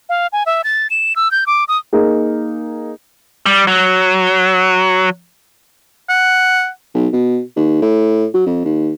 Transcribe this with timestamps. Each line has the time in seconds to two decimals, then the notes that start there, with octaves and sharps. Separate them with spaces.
0.09 F5
0.33 G#5
0.46 E5
0.64 A6
0.90 E7
1.16 E6
1.31 G6
1.47 D6
1.68 D#6
1.93 A#3 D#4 G#4
3.46 G3
3.67 F#3
6.09 F#5
6.94 B1
7.13 B2
7.56 D#2
7.82 A2
8.34 F#3
8.46 F2
8.64 D#2